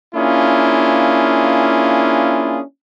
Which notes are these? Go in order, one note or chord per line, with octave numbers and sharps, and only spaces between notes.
A#3 C#4 D4 E4 F4 G#4